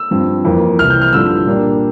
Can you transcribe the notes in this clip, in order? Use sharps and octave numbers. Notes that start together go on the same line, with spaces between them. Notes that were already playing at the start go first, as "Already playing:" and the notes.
Already playing: E6
G2 F3 C4
F2 E3 A#3
C2 C3 E3 F6
G6
F6
G2 D3 F3 E6
A#2 G3 A#3 D4